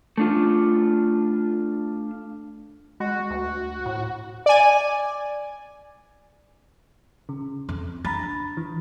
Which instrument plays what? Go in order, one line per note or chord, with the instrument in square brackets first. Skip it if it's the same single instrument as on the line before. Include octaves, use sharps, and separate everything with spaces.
[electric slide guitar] A3 D4 F4
[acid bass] G#3 [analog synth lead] F#4
[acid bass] D2
A2
[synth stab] D5 G#5
[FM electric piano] C#3
[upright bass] F2
[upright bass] D4 [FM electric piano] A#5 B5 A6
[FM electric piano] E3